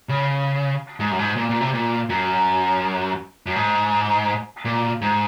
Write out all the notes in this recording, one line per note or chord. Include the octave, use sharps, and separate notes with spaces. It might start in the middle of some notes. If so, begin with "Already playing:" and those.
C#3
G#2
F#2
G#2
A#2
A#2
C3
A#2
F#2
F#2
G#2
A#2
G#2